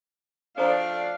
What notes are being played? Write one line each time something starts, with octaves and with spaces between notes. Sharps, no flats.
F3 A3 D4 A4 C5 F5 A#5